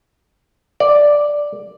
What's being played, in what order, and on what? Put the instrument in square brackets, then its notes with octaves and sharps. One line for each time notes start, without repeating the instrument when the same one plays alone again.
[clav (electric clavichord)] D5